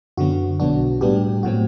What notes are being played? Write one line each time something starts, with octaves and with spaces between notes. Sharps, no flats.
F#2 D3 F#3 B3 F#4
B1 B2 F#3 B3 D4 F#4
A2 G3 B3 D4 G4
A2 F#3 C4 F#4